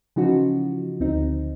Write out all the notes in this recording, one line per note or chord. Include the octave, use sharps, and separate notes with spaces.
C#3 E3 F3 D#4 F#4
D2 C4 D#4